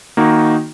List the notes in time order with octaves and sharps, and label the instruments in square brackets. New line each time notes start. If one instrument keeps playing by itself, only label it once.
[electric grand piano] D#3 A#3 D#4 F#4